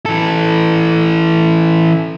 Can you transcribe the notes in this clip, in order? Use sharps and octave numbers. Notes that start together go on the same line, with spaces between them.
E3 A4